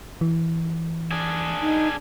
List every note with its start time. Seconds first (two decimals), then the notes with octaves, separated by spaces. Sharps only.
0.21 E3
1.11 D4 G#4
1.61 D#4